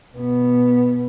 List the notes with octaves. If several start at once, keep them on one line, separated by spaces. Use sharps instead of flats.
B2 B3